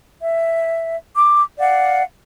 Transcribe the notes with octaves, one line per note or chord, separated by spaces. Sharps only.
E5
D6
D5 F5 F#5